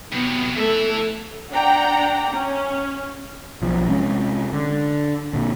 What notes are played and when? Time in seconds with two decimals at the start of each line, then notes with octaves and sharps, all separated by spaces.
0.12 C3 F#3 B3
0.56 E3 A3 E5
1.52 D4 F#5 G5 A#5
2.33 C#4
3.62 B1 F3
3.87 C3 G#3 C#4
4.53 D3
5.33 A#2 D3